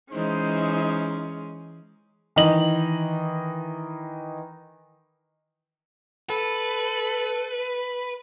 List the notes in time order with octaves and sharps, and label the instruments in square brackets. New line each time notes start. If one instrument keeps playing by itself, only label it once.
[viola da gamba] E3 [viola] G#3 C#4 [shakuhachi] D#4 [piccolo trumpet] C5
[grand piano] D#3 E3 D#5 F#7
[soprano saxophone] A4 [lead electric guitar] B4